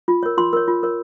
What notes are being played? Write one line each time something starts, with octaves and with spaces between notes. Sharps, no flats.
F4
A#4 C#5
F4 C6
A#4 C#5
F4
A#4 C#5